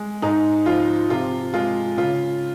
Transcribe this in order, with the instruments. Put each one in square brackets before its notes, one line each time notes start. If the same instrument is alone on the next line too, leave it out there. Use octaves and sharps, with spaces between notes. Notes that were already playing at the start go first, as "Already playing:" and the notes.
Already playing: [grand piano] G#3
G#2 D#4
F3 F4
C3 F4
G#3 F4
C#3 F4